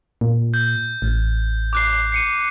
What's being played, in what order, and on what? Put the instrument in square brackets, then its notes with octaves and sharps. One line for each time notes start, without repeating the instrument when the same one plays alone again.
[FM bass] A#2
[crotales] G6
[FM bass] A1
[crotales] D6 F#6 C7
C7 C#7 D#7